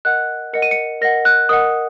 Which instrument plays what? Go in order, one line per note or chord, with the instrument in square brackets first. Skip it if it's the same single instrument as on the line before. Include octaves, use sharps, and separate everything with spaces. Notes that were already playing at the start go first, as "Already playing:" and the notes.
[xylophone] A#4 D#5 F#5 F#6
A#4 D#5 F#5 C#7
D#7
C#7
A#4 D#5 F#5 A#6
F#6
A#4 D#5 F#5 D#6